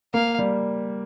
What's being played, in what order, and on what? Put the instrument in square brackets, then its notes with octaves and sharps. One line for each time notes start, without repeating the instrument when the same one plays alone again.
[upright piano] A#3 [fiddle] F5
[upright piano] G3